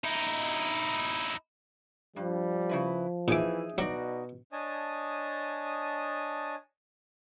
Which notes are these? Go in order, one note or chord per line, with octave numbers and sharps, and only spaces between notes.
D#4 E4
G2 F3 G3
C#3 E4 B4
A#2 E3 D#4 G#4 E5 D6
B2 F#3 D#4 F#4 D5
D4 C#5 D#5 G#5 A5 D#6